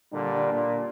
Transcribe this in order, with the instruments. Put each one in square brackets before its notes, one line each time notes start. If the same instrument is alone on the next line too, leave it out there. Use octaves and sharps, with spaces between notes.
[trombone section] A#2 D3 G3 [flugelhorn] D4
[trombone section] A#2